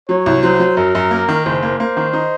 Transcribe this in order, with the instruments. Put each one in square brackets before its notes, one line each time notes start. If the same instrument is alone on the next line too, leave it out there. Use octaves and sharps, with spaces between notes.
[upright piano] F#3 [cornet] C#5
[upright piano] C2
[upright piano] F#3 [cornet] C5
[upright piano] F#3
[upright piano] F#2 [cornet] A#4
[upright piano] F#2
A#3
D#3
[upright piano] F#1 [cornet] C5
[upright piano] A#3
[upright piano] A#3 [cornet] C5
[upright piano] D#3
D#4